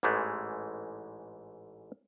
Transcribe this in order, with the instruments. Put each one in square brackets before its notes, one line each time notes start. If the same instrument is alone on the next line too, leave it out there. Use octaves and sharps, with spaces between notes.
[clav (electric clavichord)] A1 G#2 E3 G#3 A3